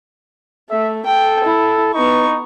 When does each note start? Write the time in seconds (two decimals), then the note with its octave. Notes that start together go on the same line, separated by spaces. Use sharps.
0.70 A3 E5
1.06 A4 G5
1.44 E4
1.94 B3 D#4 C#6